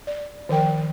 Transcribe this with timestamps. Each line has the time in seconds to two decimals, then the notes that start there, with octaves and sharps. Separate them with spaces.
0.07 D5
0.49 D#3 F3 A#4 G5